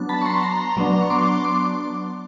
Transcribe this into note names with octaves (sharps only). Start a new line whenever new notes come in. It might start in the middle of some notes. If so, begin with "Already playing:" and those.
Already playing: F#3 B3 D4
A5 B5
C#6
A#5 C6
A#5 C6
F#3 B3 D4
C#6
C6 D6
C6 D6